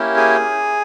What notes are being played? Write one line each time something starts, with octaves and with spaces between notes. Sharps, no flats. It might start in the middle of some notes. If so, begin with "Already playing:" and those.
Already playing: A#3 C#4 E4 G4
G#4